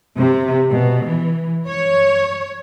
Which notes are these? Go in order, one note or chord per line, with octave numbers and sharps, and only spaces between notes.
C3
B2
E3
C#5